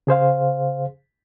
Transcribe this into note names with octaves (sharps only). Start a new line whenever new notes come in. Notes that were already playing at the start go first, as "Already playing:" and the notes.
C#3 G#4 C5 F5